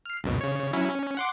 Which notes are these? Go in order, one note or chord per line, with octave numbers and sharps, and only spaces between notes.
F6 C7
C#2 F#2 B2
C#3 C#5
F#3 C#4 E4
C#4
F#5 C6 D6